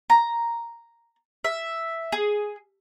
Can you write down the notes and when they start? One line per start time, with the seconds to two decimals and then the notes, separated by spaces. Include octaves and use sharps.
0.10 A#5
1.44 E5
2.12 G#4